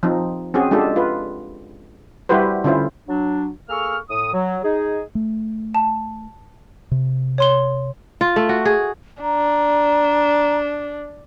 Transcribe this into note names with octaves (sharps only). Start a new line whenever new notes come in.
F3 C4 D#4
C4 C#4 F#4 G#4
G#3 D4 F4 G4 A4
F4 B4
G3 E4 F#4 G4 B4 C5
D3 C#4 E4 F4 C5
F#3 D4
A#3 G#4 A4 C#6 F6
A2 D#6
F#3
D#4 G#4
A3
A5
C3
C#5 C6 G7
F4
A3
F#4
G#4
D4 A#5